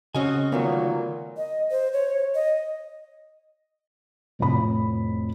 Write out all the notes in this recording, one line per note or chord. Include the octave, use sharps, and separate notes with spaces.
C#3 C4 C#4 F#4 D#5 G#5
D2 A#2 D#3 F#3 A3 B3
D#5
C5
C#5
D#5
F1 F2 A2 B5